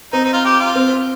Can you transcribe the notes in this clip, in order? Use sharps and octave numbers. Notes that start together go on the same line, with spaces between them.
C4 D#4
D#4
F4
G4
F4
C4